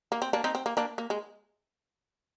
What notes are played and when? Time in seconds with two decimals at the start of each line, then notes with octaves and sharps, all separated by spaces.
0.12 A#3
0.22 C4
0.33 A#3 D4
0.44 C4 D#4
0.55 C4
0.66 A#3
0.77 A#3 D4
0.98 A#3
1.10 G#3